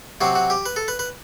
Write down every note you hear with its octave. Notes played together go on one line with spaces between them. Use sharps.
C3 F#3 C4 F#4
F#4
G4
B4
A4
B4
B4